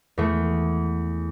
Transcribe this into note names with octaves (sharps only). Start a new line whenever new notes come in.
E2 A3